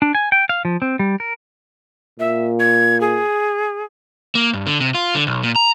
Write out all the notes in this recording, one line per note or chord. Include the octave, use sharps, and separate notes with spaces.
D4
G#5
G5
F5
F3
C4
G3
A#4
A#2 E5
G#6
G#4
A#3
G2
D3
C3
F4
D3
B1
A#2
A#5